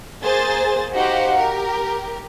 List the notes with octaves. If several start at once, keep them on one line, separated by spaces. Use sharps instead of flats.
A#3 G#4 C5 A6
D#4 F#4 G4 C5 F5 F#5
G4 A#4